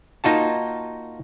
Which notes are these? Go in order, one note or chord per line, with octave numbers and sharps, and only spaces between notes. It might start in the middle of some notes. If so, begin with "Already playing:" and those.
A#3 D#4 F4 F#4 A5